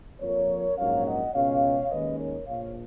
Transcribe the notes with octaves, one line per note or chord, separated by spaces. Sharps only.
F2 F3 A#3 A#4 C#5
A#1 G#2 F#3 A#3 C#4 C#5 F5
D#5 F#5
C#2 B2 G#3 C#4 C#5 F5
D#2 D#3 G#3 C#4 B4 D#5
A#4 C#5
A#1 A#2 F3 C#5 F5